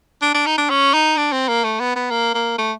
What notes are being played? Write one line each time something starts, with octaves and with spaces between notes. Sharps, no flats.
D4
D4
D#4
D4
C#4
D#4
D4
C4
A#3
A3
B3
B3
A#3
A#3
A3